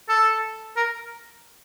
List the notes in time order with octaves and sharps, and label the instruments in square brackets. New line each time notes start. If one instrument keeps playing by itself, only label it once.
[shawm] A4
A#4